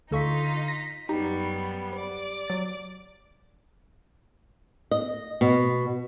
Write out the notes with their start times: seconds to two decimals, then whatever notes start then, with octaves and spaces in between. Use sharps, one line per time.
0.11 D2 D3 D#4 F4 A4 F5 C#6 B6
0.68 A#6 B6
1.09 F#2 G3 B3 D#4 G4
1.95 D5
2.48 F#3 A6
4.91 D#5
5.41 B2